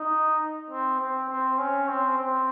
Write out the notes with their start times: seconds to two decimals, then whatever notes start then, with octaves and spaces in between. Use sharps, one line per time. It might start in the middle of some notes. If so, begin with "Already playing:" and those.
Already playing: D#4
0.71 C4
1.00 C4
1.29 C4
1.59 C#4
1.88 C4
2.18 C4